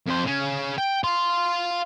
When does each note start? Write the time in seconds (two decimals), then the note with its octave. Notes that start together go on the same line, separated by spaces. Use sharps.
0.07 F2 C5
0.25 C#3 C#4
0.78 G5
1.04 F5 C6